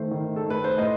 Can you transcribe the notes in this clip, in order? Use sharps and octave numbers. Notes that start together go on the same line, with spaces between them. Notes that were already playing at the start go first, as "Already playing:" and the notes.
Already playing: D#3 A3 C5
D#3
A4
A3
B4
C5
A2 D#5